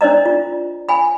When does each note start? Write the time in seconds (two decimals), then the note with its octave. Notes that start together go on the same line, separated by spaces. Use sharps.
0.01 D4 C5 D5 D#5 A#5
0.26 F4
0.89 G#5 B5